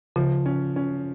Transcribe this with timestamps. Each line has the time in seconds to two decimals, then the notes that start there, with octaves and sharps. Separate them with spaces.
0.16 C#3 F3
0.46 C#4
0.76 C#4